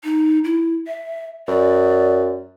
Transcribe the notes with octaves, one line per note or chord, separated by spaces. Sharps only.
D#4
E4
E5
F#2 D5